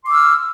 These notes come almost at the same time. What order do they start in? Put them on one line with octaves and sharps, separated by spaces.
C6 D6 E6 F6